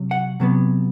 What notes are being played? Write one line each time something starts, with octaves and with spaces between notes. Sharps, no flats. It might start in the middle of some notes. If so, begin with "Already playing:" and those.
Already playing: C3 F#3
F#5
C3 F#3 B3